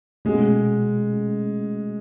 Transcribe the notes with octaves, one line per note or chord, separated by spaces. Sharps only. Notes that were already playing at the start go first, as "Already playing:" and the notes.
B2 G#3 A3 C#4 F#4